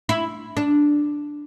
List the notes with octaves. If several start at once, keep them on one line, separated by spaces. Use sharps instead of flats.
E4
D4